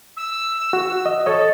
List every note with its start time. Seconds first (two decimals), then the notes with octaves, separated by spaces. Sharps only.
0.16 E6
0.73 F#4
1.06 D#5
1.26 A4 C#5 D#5